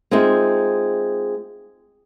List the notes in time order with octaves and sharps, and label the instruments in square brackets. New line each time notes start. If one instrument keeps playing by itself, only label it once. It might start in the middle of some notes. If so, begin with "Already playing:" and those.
[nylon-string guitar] G#3 C4 D#4 F4 E5